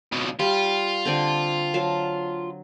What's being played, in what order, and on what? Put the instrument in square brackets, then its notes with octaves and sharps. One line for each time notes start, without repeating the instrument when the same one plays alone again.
[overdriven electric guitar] C#2 B2
[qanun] G3 [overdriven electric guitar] F4
[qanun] D3 C4 D5
F#3 F5 A5